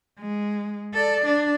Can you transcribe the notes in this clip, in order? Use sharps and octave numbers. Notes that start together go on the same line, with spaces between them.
G#3
A4 D5
D4